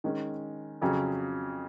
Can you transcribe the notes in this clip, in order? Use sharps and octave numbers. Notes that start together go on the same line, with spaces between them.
D#3 G#3 C#4
F2 C#3 F#3 C#4